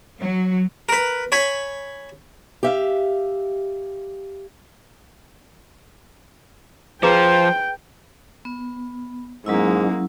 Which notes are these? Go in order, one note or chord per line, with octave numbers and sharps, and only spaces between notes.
F#3
A#4 B4
C#5 G#5 B5
G4 E5 F5
F3 G#4 B4 C5 G5 A#5
B3
G#2 F#3 G#3 A#3 C#4 E4